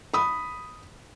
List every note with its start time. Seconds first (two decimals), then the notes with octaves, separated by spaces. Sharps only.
0.14 B5 D#6